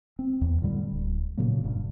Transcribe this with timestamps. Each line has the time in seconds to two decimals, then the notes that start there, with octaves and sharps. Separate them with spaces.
0.19 C4
0.41 E2
0.62 A2 D3 G3
0.91 D1
1.37 A#2 C#3 F#3 A#3
1.64 F1 G2